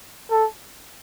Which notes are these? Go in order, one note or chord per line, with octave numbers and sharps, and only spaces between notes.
A4